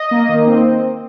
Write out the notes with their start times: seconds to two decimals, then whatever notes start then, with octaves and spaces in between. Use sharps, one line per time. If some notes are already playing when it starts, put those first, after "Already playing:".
Already playing: D#5
0.11 A#3
0.29 D#3
0.47 C4